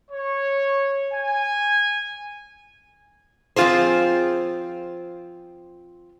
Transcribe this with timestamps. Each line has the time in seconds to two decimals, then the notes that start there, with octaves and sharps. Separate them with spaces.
0.11 C#5
1.14 G#5
3.56 F3 C4 C#4 F4 G#4 C5